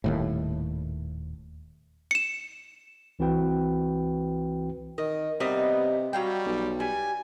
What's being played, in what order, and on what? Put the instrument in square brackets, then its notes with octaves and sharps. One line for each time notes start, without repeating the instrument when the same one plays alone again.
[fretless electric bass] D#1 D#2 A2
[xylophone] C#7 E7
[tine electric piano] C2 E3 C4 F#4 B4 G5
[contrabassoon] D#3 [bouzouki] D#5
[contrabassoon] C3 [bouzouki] G3 D#4 D#5 [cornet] B3
[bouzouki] F#3 F5 G5 [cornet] G3
[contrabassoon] B1
[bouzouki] G3 [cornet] G#5